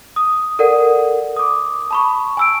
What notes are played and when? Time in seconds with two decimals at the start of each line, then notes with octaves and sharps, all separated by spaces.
0.16 D#6
0.59 A4 A#4 D5 F#5
1.36 D6 D#6
1.91 A5 B5 C#6
2.37 G#5 E6 D7